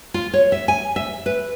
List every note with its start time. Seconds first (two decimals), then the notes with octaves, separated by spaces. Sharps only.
0.14 F4
0.34 C#5
0.52 E5
0.68 G#5
0.96 E5
1.26 B4